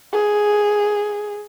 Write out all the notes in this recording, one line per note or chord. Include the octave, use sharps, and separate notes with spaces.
G#4